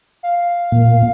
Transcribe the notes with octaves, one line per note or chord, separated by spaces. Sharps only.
F5
A#2